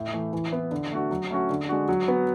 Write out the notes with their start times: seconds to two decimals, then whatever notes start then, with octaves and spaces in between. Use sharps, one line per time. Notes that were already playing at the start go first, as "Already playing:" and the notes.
Already playing: A2
0.13 E3 A3
0.33 E3
0.52 B3 E4
0.71 D3
0.92 A3 D4 F#4
1.11 F#3
1.31 A3 C#4 F#4
1.50 D3
1.69 G#3 D4 F#4
1.89 F#3
2.08 B3 F#4